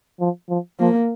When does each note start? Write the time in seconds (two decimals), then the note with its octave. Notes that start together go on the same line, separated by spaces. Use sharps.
0.20 F3
0.49 F3
0.80 F3 A#3